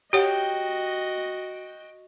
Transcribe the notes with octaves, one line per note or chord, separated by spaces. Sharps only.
F#4 G4 C#5 D#5 F#5 G5